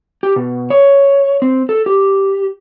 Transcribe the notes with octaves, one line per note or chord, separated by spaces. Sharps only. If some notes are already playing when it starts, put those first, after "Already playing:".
G4
B2
C#5
C4
A4
G4